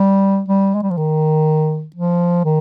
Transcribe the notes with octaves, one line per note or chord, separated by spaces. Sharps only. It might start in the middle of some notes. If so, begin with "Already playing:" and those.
Already playing: G3
G3
G#3
G3
F3
D#3
F3
D#3